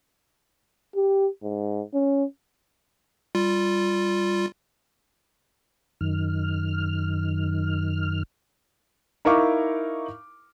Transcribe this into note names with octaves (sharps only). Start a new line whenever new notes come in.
G4
G#2
C#4
G3 F4
F#2 D#3 F6
D#4 E4 A#4 F5 C#6 D6